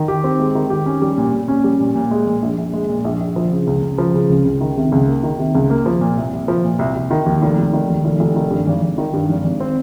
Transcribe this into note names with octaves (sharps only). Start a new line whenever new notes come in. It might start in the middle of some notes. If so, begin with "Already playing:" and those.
Already playing: D#3
G4
C4
G#3
D#3
G4
C#4
G3
A#2
A#2
C#4
G3
A#2
A#2
G#3
A#2
A#1
A#1
G#3
A#2
A#1
A#1
F3
C#3
C#2
C#2
F3
C#3
C#2
C#2
D#3
C3
C#2
A#3
D#3
C3
C#2
A#3
F3
A#2
C2
C2
F3
A#2
C2
C2
D#3
D#2
F1
F1
D#3
D#2
F1
F1
D#3
G2
G#1
G#1
D#3
G2
G#1
G#1
C4